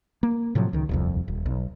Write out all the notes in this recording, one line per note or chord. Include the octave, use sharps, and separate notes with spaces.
A#3
A2 C3 F3 F#3
C#2 D#3
D#1 C2 F2
D#1
B1